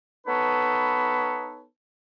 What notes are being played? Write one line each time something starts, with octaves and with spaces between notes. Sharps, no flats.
B3 D#4 A4 B4 C#5